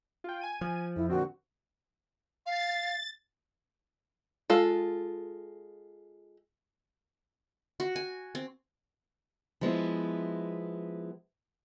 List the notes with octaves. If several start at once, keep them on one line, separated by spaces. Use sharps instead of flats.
F4 G5
G#5 D#7
F3
F2 E4
A#2 D3 C4 F#4
F5 A6
G#3 F4 A4
F#4
G#5
C4
F3 G#3 B3 E4